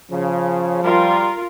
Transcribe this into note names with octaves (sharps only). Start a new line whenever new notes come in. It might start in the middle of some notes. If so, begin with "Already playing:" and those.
C#3 F3
G3 F4 A#4